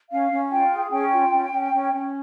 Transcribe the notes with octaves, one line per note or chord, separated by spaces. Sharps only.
C#4 F5
C#4
F4 G5
G#4
C#4 G5
F4
C#4
C#4
C#4
C#4